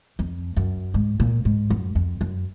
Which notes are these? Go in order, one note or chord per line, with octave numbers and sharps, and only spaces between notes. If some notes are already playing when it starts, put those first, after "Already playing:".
F2
F#2
G#2
A#2
G#2
F#2
F2
F#2